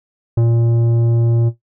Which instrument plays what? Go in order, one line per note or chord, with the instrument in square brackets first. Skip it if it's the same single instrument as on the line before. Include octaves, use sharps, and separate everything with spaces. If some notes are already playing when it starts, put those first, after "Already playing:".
[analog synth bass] A#2